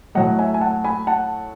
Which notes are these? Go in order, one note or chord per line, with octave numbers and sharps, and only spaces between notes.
A2 F#3 A3 D#5 F#5
E5 G#5
G#5
F#5 A5
G#5 B5
F#5 A5